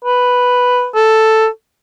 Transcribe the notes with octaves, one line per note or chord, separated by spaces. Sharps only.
B4
A4